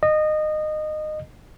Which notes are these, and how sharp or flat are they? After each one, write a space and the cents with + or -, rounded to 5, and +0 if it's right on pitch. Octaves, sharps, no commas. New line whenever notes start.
D#5 -20